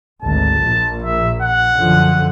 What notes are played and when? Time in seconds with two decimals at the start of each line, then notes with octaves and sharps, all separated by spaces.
0.23 G#1 D2 A5
0.60 A#1 A#2
1.03 E5
1.42 F#5
1.75 F#2 D3 F3